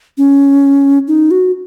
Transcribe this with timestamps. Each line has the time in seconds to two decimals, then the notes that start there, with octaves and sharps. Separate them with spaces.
0.18 C#4
1.08 D#4
1.31 F#4